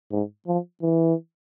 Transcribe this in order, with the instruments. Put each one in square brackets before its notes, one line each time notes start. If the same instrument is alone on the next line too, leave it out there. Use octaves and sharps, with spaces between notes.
[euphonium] G#2
F3
E3